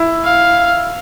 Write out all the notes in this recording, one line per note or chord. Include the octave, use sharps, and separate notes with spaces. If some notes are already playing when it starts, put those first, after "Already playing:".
Already playing: E4
F5